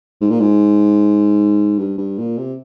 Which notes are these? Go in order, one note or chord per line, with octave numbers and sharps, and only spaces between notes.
G#2
A#2
G#2
G2
G2
A#2
C3